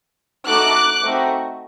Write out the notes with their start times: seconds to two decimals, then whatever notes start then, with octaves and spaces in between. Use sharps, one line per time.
0.46 A3 D#4 F#4 A4 D6 F#6
1.03 A3 C4 D#4 F#4